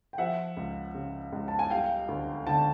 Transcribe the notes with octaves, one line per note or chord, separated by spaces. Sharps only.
G5
F3 E5 F#5
C#2
C#3
C#2
A5
G#5
G3 F5 G5
D2
D3 G5 A5